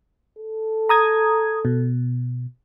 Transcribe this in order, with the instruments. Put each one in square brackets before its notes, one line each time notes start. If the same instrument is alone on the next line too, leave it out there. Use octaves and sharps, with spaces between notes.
[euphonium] A4
[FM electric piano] A#5 D#6 G#6
B2